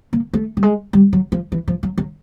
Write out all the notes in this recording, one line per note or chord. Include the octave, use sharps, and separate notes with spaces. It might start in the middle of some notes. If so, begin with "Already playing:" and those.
A#3
A3
G3
G#3
G3
F#3
F3
E3
F3
F#3
F#3